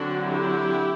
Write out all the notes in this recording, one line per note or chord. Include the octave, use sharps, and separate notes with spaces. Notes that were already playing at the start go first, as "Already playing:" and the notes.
Already playing: D3 F#3 C4 D4 F#4
E4 G4